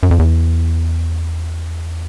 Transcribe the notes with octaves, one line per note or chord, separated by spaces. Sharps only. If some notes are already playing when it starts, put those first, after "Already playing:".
F#2
F2
E2